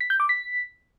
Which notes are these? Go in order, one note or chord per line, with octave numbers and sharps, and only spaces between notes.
B6
G6
D6
B6